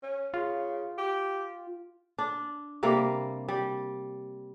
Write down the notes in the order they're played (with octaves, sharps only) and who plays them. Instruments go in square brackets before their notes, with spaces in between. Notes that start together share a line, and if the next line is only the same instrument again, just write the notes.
[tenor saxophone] C#4
[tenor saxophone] C#3 [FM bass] F4
[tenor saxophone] G4
[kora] D4
C3 G3 A#3
G3